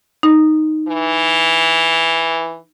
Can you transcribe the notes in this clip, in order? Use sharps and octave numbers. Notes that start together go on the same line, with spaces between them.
D#4
E3